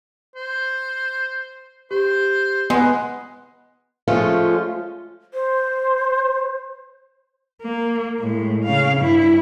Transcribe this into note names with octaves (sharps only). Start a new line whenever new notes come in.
C5
G4 C5
G#3 B3
F3 G#3 A3 C#4 F4
C5
A#3
A2 G#3
C#3 F5
G2 E4